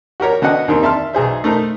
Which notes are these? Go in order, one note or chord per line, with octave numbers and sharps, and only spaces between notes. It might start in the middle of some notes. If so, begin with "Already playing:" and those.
F#4 G4 A#4 C#5
D3 B3 F#4 D#5 F#5
D#2 D#3 C4
E5 A5 C6 F6
B1 G#4 C5 E5
A3 D#4 A#4 C5